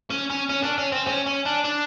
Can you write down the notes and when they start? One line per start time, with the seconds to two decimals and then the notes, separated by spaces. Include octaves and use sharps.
0.10 C#4
0.30 C#4
0.49 C#4
0.63 D4
0.78 C#4
0.92 C4
1.07 C#4
1.26 C#4
1.46 D4
1.64 D4